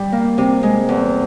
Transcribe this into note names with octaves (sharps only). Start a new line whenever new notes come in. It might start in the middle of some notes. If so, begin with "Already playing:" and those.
Already playing: G3
A#3
C3
G#3
E2